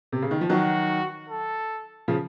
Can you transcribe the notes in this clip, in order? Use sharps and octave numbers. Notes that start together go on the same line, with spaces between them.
C3
C#3
D#3
F3
D#3 F#3 F#4
A4
C#3 F3